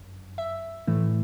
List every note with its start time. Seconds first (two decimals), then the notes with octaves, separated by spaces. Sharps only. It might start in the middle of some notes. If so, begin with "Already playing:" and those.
Already playing: G1 F#2
0.38 E5
0.87 A2 E3 A3